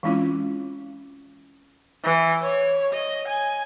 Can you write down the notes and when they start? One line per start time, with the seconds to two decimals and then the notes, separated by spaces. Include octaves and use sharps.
0.03 E3 G#3 C4 C#4 E4 F4
2.04 E3
2.42 C#5
2.93 D#5
3.28 G#5